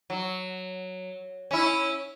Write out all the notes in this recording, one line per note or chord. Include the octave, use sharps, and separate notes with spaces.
F#3
C#4 E4